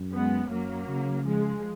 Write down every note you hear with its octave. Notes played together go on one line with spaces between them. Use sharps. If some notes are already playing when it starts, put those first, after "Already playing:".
Already playing: F#2
G#3 B3
F#2 F#3 A#3
C#3
F3 G#3